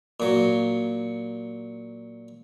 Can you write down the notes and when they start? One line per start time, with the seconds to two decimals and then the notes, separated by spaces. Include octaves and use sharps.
0.20 A#2 F#3